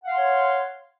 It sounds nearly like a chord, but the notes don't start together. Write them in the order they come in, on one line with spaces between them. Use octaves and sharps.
F#5 F5 C6 C#5